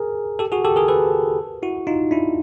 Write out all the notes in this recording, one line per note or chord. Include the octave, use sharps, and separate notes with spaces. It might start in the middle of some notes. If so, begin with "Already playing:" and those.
Already playing: G#4 A#4
G4 A4
F#4 G#4
G4 A4
G#4 A#4
A4 B4
E4 F#4
D#4 F4
D4 E4